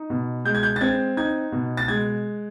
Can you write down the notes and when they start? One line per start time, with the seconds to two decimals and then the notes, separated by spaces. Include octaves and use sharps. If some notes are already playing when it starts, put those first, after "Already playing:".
Already playing: D#4
0.10 B2
0.45 G#3 G6
0.55 G#6
0.63 G6
0.76 A6
0.81 C4 G#6
1.17 D#4 G#6
1.52 B2
1.77 A6
1.88 G#3 G#6